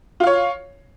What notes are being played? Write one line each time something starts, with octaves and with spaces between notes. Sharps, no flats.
F4 C#5 F5